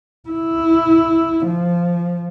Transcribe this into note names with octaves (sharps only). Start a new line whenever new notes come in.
E4
F3